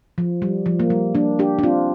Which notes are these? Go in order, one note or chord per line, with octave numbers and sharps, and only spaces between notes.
F3
G3
F3
A#3
G3
A#3 D4
D4 G4
D4
C4 F4